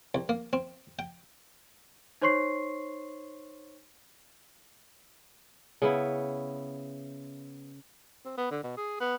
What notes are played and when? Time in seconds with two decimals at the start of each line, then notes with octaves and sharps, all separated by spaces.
0.15 C2
0.29 A#3
0.53 C4
0.99 G5
2.21 D#4 C5 C#5 C6 C#6 C7
5.82 C#3 B3 E4
8.25 C4
8.38 B3
8.51 D3
8.64 B2
8.77 G#4
9.00 B3